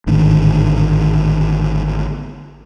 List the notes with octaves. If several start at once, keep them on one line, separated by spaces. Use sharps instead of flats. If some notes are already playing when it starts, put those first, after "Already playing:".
G#1 A2 D3 D#3